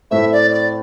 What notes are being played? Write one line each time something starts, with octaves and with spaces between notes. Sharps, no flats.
A2 A3 C4 E5
D5
D5